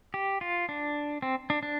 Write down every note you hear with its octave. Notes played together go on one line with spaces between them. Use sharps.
G4
F4
D4
C4
D4
D4